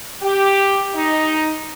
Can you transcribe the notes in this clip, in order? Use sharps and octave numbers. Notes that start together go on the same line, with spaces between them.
G4
D#4